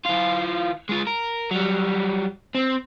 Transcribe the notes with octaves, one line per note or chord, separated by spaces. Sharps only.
E3 F4
G#3 F4
A#4
F#3 G3
C4